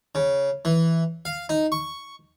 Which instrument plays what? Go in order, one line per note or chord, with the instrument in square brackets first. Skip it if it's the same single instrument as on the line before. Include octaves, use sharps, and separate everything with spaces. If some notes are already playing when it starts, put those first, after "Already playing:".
[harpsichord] C#3
E3
F5
D#4
C#6